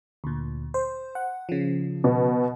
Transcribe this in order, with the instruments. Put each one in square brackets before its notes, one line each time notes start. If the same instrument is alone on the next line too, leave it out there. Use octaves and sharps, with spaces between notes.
[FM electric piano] D2 A#2
C5
F#5
C#3 F3
[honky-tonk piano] B2